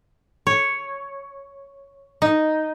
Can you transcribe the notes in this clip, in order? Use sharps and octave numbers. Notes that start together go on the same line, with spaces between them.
C#5
D#4